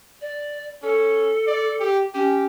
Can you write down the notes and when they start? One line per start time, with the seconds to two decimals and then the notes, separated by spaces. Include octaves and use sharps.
0.21 D5
0.83 C#4 A4
1.47 D5
1.80 G4
2.14 C#4 G4